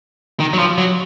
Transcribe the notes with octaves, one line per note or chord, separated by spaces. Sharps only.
D#3
F#3
F3
F#3